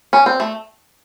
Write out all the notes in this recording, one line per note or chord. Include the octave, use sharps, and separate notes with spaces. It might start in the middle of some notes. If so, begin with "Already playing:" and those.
C#4
C4
A3